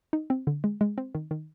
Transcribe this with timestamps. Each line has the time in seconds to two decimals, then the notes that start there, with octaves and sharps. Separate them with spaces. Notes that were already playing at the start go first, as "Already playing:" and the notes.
0.13 D#4
0.30 C4
0.47 D3
0.64 G#3
0.81 G#3
0.98 C4
1.15 D#3
1.31 D#3